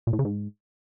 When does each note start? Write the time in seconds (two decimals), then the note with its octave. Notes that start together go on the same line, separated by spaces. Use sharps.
0.07 A#2
0.13 A2
0.19 C#3
0.25 G#2